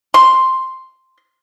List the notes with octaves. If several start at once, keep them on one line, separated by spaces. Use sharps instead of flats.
C6